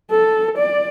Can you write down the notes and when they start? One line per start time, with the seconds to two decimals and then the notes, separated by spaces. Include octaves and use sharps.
0.11 A4
0.58 D5